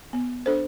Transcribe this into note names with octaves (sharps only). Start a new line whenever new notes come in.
B3
D4 A4 C5